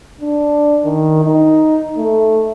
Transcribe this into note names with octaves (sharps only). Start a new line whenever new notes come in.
D4
D#3
D#4
A3